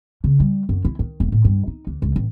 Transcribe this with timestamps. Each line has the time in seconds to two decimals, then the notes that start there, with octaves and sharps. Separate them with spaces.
0.24 C#3
0.40 G3
0.69 F#2
0.85 E4
0.99 D#3
1.20 E1
1.32 A2
1.45 G2
1.67 D#4
1.87 D2
2.02 C#2
2.16 A1